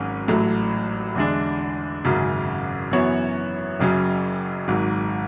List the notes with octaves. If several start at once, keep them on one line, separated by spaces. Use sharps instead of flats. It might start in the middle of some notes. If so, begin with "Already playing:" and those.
Already playing: G#1 G#2 F#3 C#4 G#4
A1 A2 F#3 A3
E2 D3 G#3 D4
G#1 F#2 C#3 F#3
F#2 E3 B3 F#4 C#5
F#1 F#2 C#3 F#3
G#1 G#2 F#3